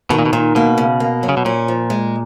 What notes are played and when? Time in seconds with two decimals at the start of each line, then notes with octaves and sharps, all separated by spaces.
0.10 B2 D#3
0.19 A#2
0.26 B2
0.33 A#2 D#3
0.55 B2 A#3
0.78 C#3
1.00 A#3
1.23 F#3
1.29 C#3
1.37 B2
1.45 A#2 C#4
1.68 F3
1.90 G#3